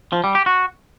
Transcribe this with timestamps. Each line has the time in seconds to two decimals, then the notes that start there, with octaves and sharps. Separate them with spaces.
0.12 F3
0.24 G3
0.35 G4
0.46 F#4